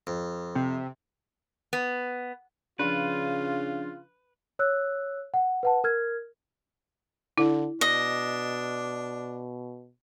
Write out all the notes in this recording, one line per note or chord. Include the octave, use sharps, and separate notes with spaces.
F2
C3
B3
C#3 F3 D4 F4 B4
C#5 E6 F#6
F#5
B4 F#5 A5
A#4 F6 G#6
D3 E4
B2 D4 D#5